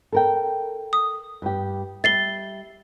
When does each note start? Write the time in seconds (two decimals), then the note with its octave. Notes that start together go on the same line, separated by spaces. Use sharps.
0.12 A4 A#4 G5
0.93 D#6
1.42 G2 G4
2.04 G3 E5 A6 C7 G7